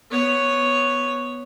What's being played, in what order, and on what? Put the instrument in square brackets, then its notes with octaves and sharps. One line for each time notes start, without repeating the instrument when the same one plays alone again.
[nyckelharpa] B3 C#5